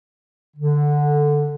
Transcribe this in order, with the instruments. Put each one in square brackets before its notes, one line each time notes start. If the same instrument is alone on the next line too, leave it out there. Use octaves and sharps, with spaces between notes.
[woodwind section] D3